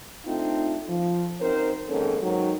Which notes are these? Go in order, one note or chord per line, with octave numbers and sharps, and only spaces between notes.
A3 C4 D4 D#4 F4
F3
F#2 C4 D#4 A#4 C5
F2 G#2 D#3 A#3 C#4 A4
G#2 D#3 F#3